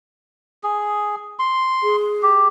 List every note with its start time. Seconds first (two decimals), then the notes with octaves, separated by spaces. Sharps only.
0.64 G#4
1.39 C6
1.83 G#4
2.23 G4